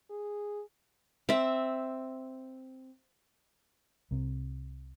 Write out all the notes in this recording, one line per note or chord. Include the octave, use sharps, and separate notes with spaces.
G#4
C4 E5
C2 C3